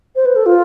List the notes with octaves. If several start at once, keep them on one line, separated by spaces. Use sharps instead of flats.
C5
B4
A4
F4